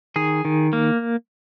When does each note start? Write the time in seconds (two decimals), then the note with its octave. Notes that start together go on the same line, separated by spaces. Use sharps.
0.16 D#3 G#4
0.45 D#3
0.73 A#3